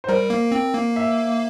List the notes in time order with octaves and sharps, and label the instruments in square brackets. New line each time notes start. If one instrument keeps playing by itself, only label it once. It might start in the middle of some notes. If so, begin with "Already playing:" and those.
[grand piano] C5
[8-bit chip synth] G3 [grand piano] A#4
[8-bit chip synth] A#3
C4
A#3
[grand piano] E5